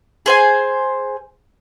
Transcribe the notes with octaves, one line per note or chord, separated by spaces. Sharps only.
G#4 C5 G#5